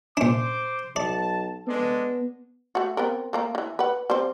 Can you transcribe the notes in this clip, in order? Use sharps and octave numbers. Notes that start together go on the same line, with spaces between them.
A#2 D4 C5 D6
B1 D5 A5
G#3 B3 D4 A4
A3 F#4
B3 C4 A#4
A3 A#3 A#5
D#3 E3
B4 F#5
G3 C4 C5